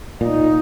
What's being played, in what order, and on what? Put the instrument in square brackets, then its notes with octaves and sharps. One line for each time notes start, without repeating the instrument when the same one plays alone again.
[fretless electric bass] A#2 [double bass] D#4